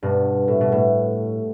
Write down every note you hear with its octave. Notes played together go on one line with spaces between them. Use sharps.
G2 B2
A2
B2
A2